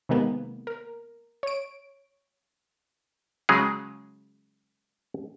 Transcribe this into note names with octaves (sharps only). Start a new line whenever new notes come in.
C3 D#3 G#3 A#3 B3
A#4
C#5 D7
C#3 F#3 G#3 G#4